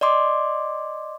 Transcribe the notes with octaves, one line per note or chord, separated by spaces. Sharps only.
D5 D#5 C6 D6